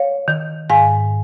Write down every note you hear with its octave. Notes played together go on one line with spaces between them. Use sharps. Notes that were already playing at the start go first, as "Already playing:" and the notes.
Already playing: C#5 F5
D#3
G#2 F5 G#5